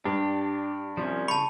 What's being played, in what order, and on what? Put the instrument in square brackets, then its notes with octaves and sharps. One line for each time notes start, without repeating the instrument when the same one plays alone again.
[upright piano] G2 [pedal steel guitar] D4 [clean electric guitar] G4
[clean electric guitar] C2 C3 G3 [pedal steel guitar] F3 C#4
[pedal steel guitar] C#3 C#6 [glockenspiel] A5 B5